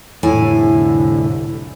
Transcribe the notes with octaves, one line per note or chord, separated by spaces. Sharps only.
C2 F2 A2 D3 E4 G#5